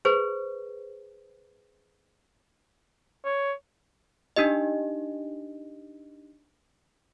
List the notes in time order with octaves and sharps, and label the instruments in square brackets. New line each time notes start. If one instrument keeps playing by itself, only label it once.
[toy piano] G#4 B4 C5
[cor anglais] C#5
[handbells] D4 D#4 G4 D#5